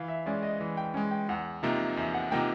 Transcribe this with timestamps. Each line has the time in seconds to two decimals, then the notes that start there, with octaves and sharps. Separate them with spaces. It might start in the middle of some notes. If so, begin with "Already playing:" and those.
Already playing: E3 F5
0.08 E5
0.26 G#3 C#4 D5
0.43 D#5
0.61 E3
0.77 G5
0.94 G#3 C#4 G#5
1.11 G5
1.29 E2 F#5
1.62 C3 F3 A#3 D#4 E5
1.97 E2 E5
2.14 F#5
2.31 C3 F3 A#3 D#4 G5